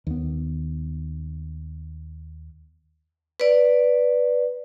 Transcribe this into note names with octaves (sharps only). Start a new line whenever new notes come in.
D#2 B3
B4 D5